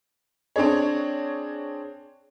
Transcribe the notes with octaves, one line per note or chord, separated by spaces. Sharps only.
C4 D4 G#4 C#5